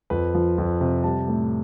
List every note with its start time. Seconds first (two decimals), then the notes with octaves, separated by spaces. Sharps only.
0.10 F2 B4
0.34 F3
0.58 F2
0.81 C3
1.04 G3 A5
1.28 A2